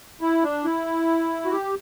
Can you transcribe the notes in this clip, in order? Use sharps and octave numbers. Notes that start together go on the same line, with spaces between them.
E4
D4
E4
F#4
G4